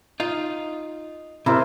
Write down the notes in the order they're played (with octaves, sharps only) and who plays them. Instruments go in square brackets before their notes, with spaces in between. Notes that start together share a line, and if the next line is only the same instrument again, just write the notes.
[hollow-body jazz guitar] D#4 F4
[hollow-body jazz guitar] C3 [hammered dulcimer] E4 A#4 C5